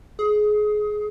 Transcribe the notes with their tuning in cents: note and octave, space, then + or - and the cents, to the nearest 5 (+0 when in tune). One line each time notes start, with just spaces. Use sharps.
G#4 +20